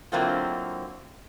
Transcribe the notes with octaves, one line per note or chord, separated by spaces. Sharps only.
D3 F#3 A#3 C4 E4 F4